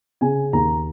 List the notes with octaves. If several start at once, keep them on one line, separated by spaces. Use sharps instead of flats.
C#3 G#5
D#2 A#5